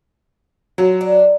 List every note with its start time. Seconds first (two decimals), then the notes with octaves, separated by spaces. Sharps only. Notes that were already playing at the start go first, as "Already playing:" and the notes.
0.78 F#3 F4
1.01 D4